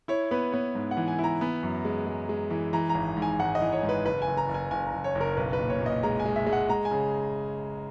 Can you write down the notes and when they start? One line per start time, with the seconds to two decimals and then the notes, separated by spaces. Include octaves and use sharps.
0.08 E4 C#5
0.31 B3 B4
0.52 B3 C#5
0.75 G#2
0.91 F#5
0.97 E3
1.08 G#5
1.19 E4
1.24 A#5
1.41 B3
1.63 F#2
1.85 G#3
2.07 G#3
2.29 G#3
2.50 E3
2.73 E3 A#5
2.89 G#1 A#5
3.17 G#2
3.22 G#5
3.40 G#1 F#5
3.55 D#5
3.61 E3
3.73 C#5
3.83 G#2
3.89 B4
4.05 F#1 B4
4.22 G#5
4.27 F#1
4.37 A#5
4.49 F#1
4.54 G#5
4.71 F#1 G#5
4.87 A#5
4.93 F#1
5.04 C#5
5.15 F#1
5.21 A#4
5.37 B1 B4
5.53 B4
5.60 A#2
5.70 C#5
5.81 A#2 D#5
6.03 G#3 A#5
6.20 G#5
6.26 G#3
6.36 E5
6.47 G#3
6.53 F#5
6.69 G#3 A#5
6.85 G#5
6.91 C#3